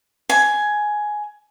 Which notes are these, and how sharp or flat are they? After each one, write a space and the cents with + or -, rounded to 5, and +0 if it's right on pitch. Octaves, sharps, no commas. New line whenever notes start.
G#5 +10